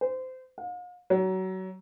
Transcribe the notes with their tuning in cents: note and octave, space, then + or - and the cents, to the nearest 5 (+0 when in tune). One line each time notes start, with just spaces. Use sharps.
C5 -25
F5 +45
F#3 +25